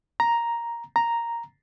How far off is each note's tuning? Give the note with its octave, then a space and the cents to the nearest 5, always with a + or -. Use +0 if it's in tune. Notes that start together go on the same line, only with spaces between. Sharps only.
A#5 +5
A#5 +0